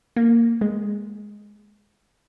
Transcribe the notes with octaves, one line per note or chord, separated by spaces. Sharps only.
A#3
G#3